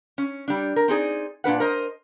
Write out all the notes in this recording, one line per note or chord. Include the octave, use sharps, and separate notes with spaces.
C#4
G3 D4
A#4
C4 D#4 G#4 D5
A#2 D4 B4 F#5
A#4 C5 D#5